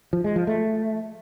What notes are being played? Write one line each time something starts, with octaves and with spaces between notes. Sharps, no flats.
F3
G#3
F3
A3